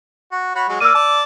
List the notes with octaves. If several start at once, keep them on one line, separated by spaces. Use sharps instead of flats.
F#4
F#4 C#5 B5
F#3 G#3 F#4
A#3 D5 E6 F6 D#7
D5 A5